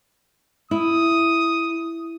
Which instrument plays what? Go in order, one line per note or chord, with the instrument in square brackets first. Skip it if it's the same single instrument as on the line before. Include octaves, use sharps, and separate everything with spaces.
[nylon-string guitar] E4 [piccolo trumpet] D#6